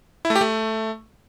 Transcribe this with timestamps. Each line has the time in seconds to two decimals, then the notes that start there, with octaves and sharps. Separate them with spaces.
0.25 E4
0.30 A3
0.35 G4
0.41 A3